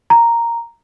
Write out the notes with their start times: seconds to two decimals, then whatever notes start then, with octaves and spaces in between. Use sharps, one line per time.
0.10 A#5